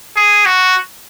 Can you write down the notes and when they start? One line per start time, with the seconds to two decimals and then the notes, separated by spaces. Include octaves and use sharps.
0.17 G#4
0.46 F#4